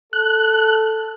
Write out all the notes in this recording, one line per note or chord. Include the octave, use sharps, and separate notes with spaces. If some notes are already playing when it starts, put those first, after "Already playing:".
A4 F#6